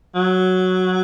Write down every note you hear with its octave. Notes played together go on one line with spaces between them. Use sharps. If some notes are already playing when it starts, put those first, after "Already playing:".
F#3